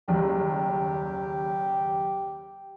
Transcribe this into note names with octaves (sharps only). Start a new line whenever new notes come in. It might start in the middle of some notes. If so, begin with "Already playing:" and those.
F#1 D#2 G3 G4